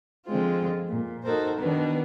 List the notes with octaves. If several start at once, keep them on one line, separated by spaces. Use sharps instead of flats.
D3 F3 G#3 C4 F4
A#2
D#4 F#4 A4 A#4 C5
B2 D#3 B3 D4